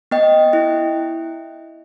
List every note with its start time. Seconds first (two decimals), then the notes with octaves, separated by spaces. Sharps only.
0.11 B3 D#5 G5
0.53 E4